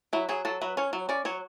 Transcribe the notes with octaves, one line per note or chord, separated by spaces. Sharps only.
F#3 E4
F#3 G#4
F#3 A4
F#3 B4
C#4 C#5
F#3
C#4 D5
F#3 C#5